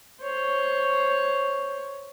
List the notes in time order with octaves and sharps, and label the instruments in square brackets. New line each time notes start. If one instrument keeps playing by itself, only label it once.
[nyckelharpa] C5 C#5